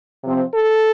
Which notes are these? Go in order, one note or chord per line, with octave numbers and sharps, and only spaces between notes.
C3 F3 C4
A4